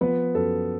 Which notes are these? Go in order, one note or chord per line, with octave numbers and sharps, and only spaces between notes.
F3 B3 B4
F#2 A4